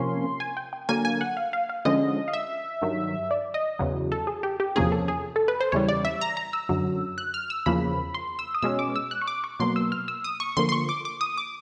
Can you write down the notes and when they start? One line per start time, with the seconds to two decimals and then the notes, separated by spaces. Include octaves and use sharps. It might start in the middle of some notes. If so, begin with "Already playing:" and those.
Already playing: C3 F3 A#3 C#4 C6
0.40 G#5
0.57 G5
0.73 G5
0.89 D3 F#3 A#3 G#5
1.05 G#5
1.21 F#5
1.37 F5
1.53 F5
1.69 F5
1.85 D3 F3 G#3 C#4 D#5
2.28 F5
2.33 E5
2.82 G2 D#3 F#3
3.31 D5
3.54 D#5
3.79 E2 C#3 F#3
4.12 A4
4.27 G#4
4.43 G4
4.60 G4
4.76 E2 C3 F3 A#3 C#4 G#4
4.92 A4
5.08 G#4
5.36 A4
5.48 B4
5.60 C5
5.72 E2 C#3 E3 G3 C#5
5.88 D5
6.05 E5
6.21 A#5
6.37 A#5
6.53 E6
6.69 F#2 D3 F#3
7.18 F#6
7.34 F6
7.50 E6
7.66 E2 C#3 F3 A#3 B5
8.14 C6
8.39 E6
8.54 D#6
8.62 B2 G#3 C#4 E6
8.79 D6
8.96 E6
9.11 F#6
9.21 C#6
9.27 D6
9.44 C#6
9.60 B2 F#3 A#3 C6
9.76 E6
9.92 F6
10.08 E6
10.24 D#6
10.40 C#6
10.57 D3 F3 A#3 C6
10.69 C6
10.72 C#6
10.89 D6
11.05 D6
11.21 D#6
11.37 D6